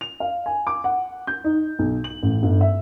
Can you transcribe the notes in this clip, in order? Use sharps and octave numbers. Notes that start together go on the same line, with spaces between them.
F7
F5
G#5
D6
F#5
G6
D#4
B1
F#7
A1
G1
E5